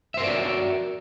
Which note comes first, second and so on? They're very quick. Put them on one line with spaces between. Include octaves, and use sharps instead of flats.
E5 C5 A#4 D5 F#4